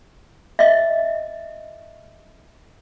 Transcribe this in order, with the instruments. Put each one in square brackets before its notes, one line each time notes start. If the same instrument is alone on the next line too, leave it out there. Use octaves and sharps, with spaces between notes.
[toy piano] D#5 E5